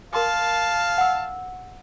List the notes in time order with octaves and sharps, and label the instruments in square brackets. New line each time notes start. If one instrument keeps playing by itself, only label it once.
[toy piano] A#4 C6 D6 [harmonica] F5 [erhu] A5
[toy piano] F#5 E6